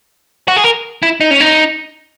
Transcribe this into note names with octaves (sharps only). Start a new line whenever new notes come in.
F#4
G#4
A#4
E4
D#4
C#4
D#4